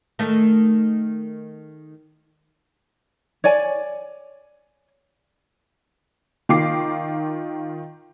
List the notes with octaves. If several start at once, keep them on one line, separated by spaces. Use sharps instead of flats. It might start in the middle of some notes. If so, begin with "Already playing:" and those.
D#3 A3
C#5 D5 G#5
D#3 F4 D6 C7